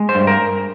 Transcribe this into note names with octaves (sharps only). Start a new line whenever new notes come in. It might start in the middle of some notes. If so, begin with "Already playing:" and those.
Already playing: G#3
C5
G2
A#4